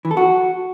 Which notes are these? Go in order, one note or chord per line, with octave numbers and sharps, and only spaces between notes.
E3
A4
F#4